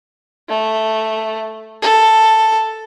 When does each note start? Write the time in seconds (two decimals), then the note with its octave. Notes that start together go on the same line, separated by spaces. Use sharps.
0.49 A3
1.82 A4